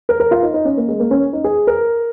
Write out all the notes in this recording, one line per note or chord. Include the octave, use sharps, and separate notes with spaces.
A#4
A#4
F4
D#4
D#4
C#4
A#3
G#3
A#3
C#4
D#4
G#4
A#4